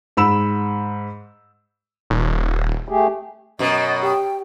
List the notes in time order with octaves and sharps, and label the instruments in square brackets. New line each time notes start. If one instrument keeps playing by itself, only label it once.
[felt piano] G#2 B5 E6 E7
[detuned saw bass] D#1
[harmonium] A3 G4 G#4
[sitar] F#2 B2 [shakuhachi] D#5
[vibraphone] G4 [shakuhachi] G5